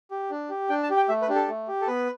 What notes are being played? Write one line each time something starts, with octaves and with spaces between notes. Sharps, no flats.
G4
D4
G4
D4 G5
A5
G4
G5
A3 E5
B4
D4 G4
A4
A3
G4
A4
B3 B4